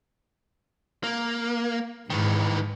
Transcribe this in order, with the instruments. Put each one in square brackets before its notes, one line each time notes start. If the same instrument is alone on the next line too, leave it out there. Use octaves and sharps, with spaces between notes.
[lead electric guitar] A#3
[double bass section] G#2 [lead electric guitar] D#3 E3